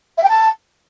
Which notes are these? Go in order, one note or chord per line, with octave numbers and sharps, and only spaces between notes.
E5
G5
A5